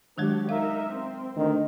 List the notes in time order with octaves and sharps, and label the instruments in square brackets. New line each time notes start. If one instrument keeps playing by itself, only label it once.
[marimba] D#3 F#3 G#3 [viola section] D4 F#4 G4
[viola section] D#4 A#4 E5 [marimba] F5
[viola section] C4
[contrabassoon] D2 [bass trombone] D#3